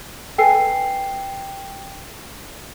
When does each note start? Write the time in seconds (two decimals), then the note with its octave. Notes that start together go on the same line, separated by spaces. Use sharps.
0.38 A4 B4 G5 G#5 C7